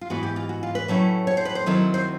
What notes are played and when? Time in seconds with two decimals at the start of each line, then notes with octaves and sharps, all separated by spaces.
0.01 F4
0.10 G#2 E3 G#3 B3 E4 F#4
0.23 G4
0.36 F4
0.49 F#4
0.63 F4
0.75 B4
0.88 A2 F#3 A3 C#4 E4
1.27 C#5
1.37 C5
1.45 B4
1.55 C5
1.66 D#3 F#3 A3 C4 E4
1.94 C5